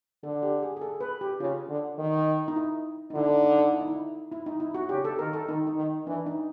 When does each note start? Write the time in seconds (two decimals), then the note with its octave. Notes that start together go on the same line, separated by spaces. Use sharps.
0.23 D3 A4
0.43 G4
0.63 G#4
0.77 G#4
0.81 A4
1.01 B4
1.21 G4
1.40 C#3 F4
1.69 D3
1.99 D#3
2.48 D#4
2.56 E4
3.10 D#4
3.14 D3 E4
3.29 D#4
3.44 D#4
3.58 D#4
3.73 E4
3.80 D#4
3.87 E4
4.32 E4
4.46 D#4
4.60 E4
4.75 F#4
4.89 C#3 G4
5.05 A4
5.19 D#3 A#4
5.33 A4
5.49 D#3 D#4
5.67 D#4
5.77 D#3
6.07 E3 D4
6.26 D#4